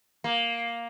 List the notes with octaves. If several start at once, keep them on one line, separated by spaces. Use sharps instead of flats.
A#3